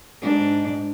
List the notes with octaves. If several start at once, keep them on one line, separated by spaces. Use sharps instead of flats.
G#2 D4